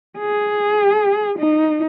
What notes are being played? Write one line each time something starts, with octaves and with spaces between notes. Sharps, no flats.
G#4
D#4